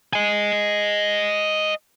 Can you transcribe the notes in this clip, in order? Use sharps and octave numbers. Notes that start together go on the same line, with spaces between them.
D#5 G#5